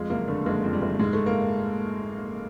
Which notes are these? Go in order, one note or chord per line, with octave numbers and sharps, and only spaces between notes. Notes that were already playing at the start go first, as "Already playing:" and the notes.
Already playing: F2 G#3
F#1 A#3
D3 A3
F#1 G#3
F2
G3
F#1
G#2 G#3
A3
A#3